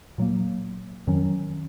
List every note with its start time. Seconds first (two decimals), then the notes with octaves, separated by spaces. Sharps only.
0.18 A#2 F#3 A#3
1.07 F2 D#3 F#3 C#4